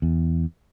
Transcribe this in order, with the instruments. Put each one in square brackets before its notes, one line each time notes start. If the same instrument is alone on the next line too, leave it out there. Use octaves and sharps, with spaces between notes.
[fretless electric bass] E2